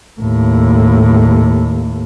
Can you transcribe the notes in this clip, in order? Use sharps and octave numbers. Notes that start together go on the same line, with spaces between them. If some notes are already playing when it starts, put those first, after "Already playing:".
D#2 A2